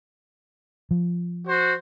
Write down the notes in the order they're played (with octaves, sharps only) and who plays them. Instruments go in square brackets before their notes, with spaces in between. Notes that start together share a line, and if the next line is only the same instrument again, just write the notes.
[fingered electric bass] F3
[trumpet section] F#4 C5